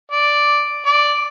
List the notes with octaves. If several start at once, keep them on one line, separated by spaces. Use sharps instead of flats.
D5
D5